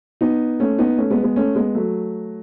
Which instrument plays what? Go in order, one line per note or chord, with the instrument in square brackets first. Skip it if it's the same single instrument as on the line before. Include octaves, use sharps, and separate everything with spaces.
[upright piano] B3 D#4
A3 C#4
B3 D#4
A3 C#4
G#3 B3
G#3 B3
A3 C#4
G#3 B3
F#3 A3